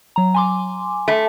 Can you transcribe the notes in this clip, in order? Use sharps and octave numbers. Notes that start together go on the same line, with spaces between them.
F#3 A#5
G#5 C6 D6
A3